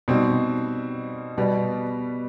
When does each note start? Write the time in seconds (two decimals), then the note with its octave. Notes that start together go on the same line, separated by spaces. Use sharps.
0.08 B2 G3 C4 D#4
1.38 B2 G3 B3